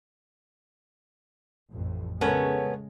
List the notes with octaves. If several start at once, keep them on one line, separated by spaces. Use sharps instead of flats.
A1 F2 A2
C#3 G#3 B3 C#4 A4 A#4 C#5